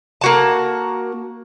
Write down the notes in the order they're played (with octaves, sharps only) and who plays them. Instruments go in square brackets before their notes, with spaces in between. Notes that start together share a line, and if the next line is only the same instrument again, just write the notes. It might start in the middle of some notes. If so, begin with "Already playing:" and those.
[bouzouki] A#3 F#4 A5